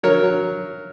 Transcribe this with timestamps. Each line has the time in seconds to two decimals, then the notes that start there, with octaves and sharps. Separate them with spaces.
0.03 F#3 A#4 C#5
0.23 F#3